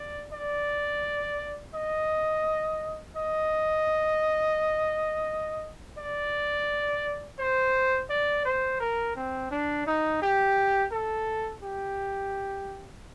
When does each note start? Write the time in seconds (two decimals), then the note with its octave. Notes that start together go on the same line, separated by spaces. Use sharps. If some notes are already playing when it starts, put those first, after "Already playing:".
Already playing: D5
0.33 D5
1.74 D#5
3.16 D#5
5.98 D5
7.39 C5
8.10 D5
8.45 C5
8.80 A#4
9.16 C4
9.51 D4
9.87 D#4
10.22 G4
10.92 A4
11.63 G4